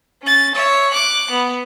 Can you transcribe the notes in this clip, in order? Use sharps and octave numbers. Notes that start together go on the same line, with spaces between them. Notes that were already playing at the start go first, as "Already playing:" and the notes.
C#4 A6
C#5 E5
D6 F#6
B3